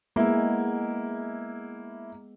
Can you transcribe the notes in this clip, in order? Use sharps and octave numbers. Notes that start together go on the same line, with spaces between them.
G#3 A#3 B3 E4